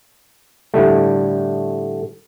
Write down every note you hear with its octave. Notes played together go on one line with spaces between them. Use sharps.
A2 D3 G3 A3